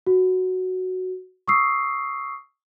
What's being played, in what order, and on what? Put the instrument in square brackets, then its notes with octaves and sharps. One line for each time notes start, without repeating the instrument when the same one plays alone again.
[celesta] F#4
C#6 D#6 E6 C7